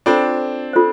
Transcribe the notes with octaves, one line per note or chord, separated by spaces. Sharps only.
C4 D4 F4 A4 C5
F4 A4 C5